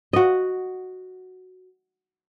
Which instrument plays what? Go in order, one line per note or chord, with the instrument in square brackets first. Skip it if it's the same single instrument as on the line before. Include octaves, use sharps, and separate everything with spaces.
[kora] F#4 D#5